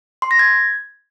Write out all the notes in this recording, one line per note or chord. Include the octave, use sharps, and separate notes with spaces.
C6
A#6
G#6